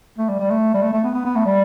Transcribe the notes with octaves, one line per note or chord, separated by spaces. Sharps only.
A3
G3
G3
A3
G3
A3
A3
B3
B3
B3
A3
G3